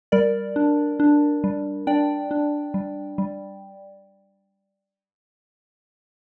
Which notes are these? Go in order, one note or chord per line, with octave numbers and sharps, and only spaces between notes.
G3 A#4 D5
D4
D4
G3
D4 D5 G5
D4
G3
G3